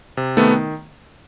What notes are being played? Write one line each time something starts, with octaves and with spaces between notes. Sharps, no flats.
C3
D#3 A3 B3